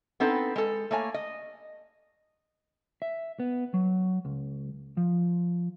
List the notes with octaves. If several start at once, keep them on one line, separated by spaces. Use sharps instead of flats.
B3 C4 D#4 A4
G#3 A4
A3 A#3 C#5 G#5
D#5
E5
B3
F#3
C#2
F3